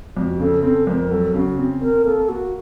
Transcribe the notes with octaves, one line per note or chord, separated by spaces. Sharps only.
F2 F#4
C#3 A4
C4 A4
F2 A#4
F#3 A4
C#3 F#4
C4
C4 A#4
A#3 A4
A#3 F#4